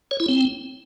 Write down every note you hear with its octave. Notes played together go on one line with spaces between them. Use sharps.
C#5
E4
C4